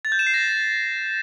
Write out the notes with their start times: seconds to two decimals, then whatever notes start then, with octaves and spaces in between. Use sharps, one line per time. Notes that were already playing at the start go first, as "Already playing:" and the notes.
0.05 A6
0.12 G6
0.19 E7
0.27 C7
0.34 A#6